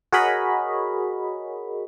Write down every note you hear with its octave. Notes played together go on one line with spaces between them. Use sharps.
F#4 G#4 A#4 C#5 D#5 B5